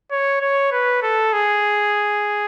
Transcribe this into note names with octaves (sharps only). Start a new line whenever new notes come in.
C#5
C#5
B4
A4
G#4